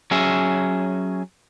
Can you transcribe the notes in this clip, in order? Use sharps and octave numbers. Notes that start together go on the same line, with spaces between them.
F#3 C#4 G#4 E5